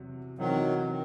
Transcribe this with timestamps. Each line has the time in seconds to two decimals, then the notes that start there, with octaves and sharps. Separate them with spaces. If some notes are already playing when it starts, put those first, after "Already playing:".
Already playing: E2 C3 F#3
0.38 C3 D#3 E3 F#3 C4 F#4
0.89 D#3